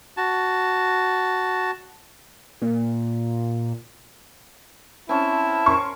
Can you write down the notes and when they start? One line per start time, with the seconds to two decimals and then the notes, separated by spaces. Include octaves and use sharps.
0.17 F#4 A5
2.61 A#2
5.09 C4 C#4 E4 A5
5.66 C#4 A#4 C6 C#6